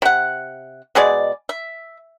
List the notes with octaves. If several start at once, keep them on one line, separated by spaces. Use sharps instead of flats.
C3 F#5
B2 G#3 G#4 D5
E5